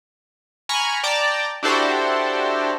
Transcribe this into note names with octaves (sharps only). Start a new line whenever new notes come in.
G#5 A#5 B5 C#6 F6
D5 G5 A5 A#5 D6
D4 E4 F#4 G4 A4 C5